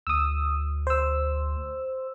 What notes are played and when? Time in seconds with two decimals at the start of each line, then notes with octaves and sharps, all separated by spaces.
0.07 D2 D#6 E6
0.87 C5 E6